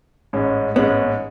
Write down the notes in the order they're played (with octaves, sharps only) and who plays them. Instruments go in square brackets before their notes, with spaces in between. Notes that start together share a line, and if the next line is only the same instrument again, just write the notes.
[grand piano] A1 G#2 G#3 C#4
[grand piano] A1 G#2 G#3 C#4 [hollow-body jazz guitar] B3